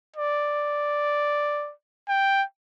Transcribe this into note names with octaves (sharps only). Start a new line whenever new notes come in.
D5
G5